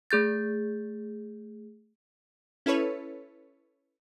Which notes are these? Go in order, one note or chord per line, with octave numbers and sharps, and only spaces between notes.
A3 G#4 G6 A6
C#4 E4 A4 B4 C#5